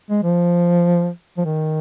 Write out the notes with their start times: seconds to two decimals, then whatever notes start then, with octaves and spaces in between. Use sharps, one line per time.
0.10 G#3
0.23 F3
1.37 F3
1.45 D#3